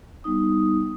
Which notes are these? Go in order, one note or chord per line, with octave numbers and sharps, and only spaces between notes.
G3 B3 D#4 D#6